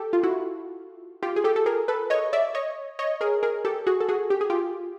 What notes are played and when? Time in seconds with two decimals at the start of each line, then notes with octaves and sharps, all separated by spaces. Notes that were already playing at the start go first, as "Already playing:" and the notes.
Already playing: G4 A4
0.13 F4
0.23 E4 F#4
1.23 F4 G4
1.36 G#4
1.44 G4 A4
1.56 A4
1.66 G#4 A#4
1.88 A4 B4
2.10 C#5 D#5
2.33 D5 E5
2.55 C#5 D#5
2.99 C#5 D#5
3.21 G#4 A#4
3.43 G#4 A#4
3.65 G4 A4
3.87 F#4 G#4
4.00 A4
4.08 F#4 G#4
4.30 G4
4.41 G#4
4.50 F4 G4